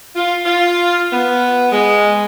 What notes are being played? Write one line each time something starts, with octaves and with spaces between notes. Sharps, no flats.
F4
F4
B3
G#3